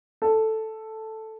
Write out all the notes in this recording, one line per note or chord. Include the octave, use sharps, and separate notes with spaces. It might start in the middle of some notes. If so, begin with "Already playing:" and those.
A4